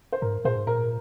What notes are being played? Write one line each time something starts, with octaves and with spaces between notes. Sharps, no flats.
C5
G#2 A#4
A#2 G#4 C5
G#2
A#2 A#4